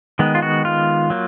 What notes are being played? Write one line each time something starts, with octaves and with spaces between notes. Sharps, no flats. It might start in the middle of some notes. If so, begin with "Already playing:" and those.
D#3 G#3 B3
F4
F#4
F4
F#3 A#3